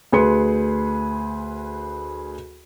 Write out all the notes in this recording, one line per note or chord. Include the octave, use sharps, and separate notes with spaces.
D2 G#4 B4 C6 C#7